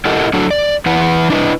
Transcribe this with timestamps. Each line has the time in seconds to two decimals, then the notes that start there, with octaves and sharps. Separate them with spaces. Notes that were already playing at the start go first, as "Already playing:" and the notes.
0.05 E4 G4 A4 A#4 D#5 F#5
0.33 F#3 D4 F#4 A4
0.51 D5
0.86 E3 E4 B4 F#5
1.30 D4 E4 B4 D#5